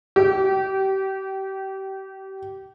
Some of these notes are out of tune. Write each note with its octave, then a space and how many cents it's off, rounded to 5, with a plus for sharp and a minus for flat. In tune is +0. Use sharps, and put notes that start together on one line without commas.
G4 -25